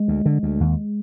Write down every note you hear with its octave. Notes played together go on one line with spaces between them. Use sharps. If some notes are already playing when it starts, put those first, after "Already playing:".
Already playing: G#3
D2
D3
D2
D#2